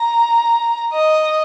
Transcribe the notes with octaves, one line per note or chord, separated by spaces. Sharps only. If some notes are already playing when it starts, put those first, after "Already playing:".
Already playing: A#5
D#5